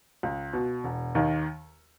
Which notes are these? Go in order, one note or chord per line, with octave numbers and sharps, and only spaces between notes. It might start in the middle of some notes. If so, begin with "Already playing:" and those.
C#2
B2
E1
D#2 D#3